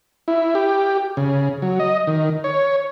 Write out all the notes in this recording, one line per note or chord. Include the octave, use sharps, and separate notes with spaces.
E4
G4
C#3
F#3
D#5
D#3
C#5